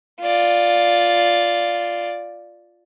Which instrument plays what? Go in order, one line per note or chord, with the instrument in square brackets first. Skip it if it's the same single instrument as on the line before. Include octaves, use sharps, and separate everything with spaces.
[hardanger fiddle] F4 D5